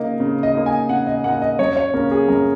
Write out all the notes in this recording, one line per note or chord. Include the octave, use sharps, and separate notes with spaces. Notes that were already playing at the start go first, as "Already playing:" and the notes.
Already playing: C#3 A#3 D#4 D#5
C#3
D#5
A#3 D#4
G#5
C#3 F#5
D#5
A#3 D#4 F#5
D#5
F#2 C#5
C#5
C#3 A#3 C#4 A#4
G#4
F#2 A#4